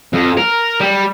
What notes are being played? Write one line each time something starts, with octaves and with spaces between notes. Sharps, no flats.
F2
A#4
G3